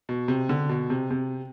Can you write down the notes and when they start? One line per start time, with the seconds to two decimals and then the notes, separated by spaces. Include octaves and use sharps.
0.09 B2
0.28 C3
0.49 D3
0.69 B2
0.90 C3
1.11 C3